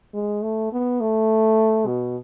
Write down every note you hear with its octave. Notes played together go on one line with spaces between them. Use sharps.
G#3
A3
B3
A3
B2